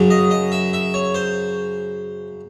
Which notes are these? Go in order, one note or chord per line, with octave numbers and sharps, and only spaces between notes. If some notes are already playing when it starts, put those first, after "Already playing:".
Already playing: F#2 C#3 F#3
D#5
D#5
E5
E5
C#5
C5